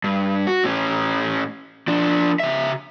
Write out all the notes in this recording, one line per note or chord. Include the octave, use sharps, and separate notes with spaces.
G2
F#4
A2 C#4
F3 D4
C#3 E5